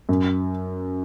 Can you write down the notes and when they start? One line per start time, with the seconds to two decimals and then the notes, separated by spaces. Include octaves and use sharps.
0.09 F#2